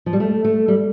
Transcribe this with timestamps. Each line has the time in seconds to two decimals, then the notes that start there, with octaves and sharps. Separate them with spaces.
0.06 F3
0.13 G3
0.20 A3
0.44 A3
0.68 G3